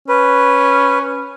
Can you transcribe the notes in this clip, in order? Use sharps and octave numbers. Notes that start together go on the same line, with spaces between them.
C#4 B4